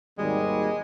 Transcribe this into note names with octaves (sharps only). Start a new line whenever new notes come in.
G#1 D#2 G3 G#3